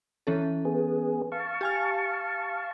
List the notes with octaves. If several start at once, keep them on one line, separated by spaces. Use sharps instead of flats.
E3 C#4 A4
B3 G#4
F5 A5 C#6
G4 G#5 F6